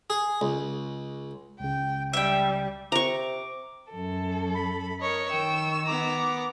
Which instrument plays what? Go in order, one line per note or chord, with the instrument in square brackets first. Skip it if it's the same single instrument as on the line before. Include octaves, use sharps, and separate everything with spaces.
[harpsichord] G#4
C#2
[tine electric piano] C#2 C#3 [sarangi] G5
[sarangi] G3 [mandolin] E5 G5
[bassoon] C3 [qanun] A#5 C#6 [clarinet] D6
[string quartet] F#2 A4
[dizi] B5
[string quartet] A#4 [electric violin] C#5 D#5 [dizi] C#6
[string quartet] D#3 E6 [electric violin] G5
[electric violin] B3 A#5 [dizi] D6